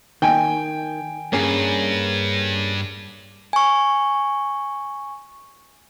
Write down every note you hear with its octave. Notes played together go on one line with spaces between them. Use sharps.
D#3 G5 G#5
G2 A#3 C#4 G#4
G#5 C#6